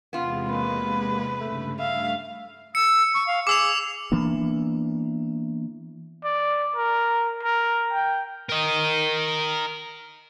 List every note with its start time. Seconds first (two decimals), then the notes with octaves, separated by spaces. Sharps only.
0.13 E2 C3 G#3 B3 F4
0.49 A#3 B4
1.40 G2 C#3 A3
1.79 G2 A3 E5 F5
2.75 E6 C#7
3.14 C#6
3.27 F5
3.47 G#4 D6 E6 F7
4.12 E3 A#3 B3 D4
6.24 D5
6.76 A#4
7.43 A#4
7.93 G5
8.49 A#4 D#5